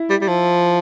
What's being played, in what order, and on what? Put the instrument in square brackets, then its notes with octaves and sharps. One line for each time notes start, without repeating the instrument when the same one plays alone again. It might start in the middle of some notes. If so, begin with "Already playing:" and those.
Already playing: [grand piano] E4
[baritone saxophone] G3
G3
F3